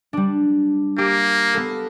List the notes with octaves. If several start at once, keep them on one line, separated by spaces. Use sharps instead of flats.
G3 D4
A#3 G4
B3 A4